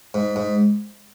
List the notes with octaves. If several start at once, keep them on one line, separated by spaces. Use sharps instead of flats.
G#2
G#2